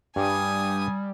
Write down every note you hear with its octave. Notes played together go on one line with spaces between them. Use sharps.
G2 G3 G#5 D#6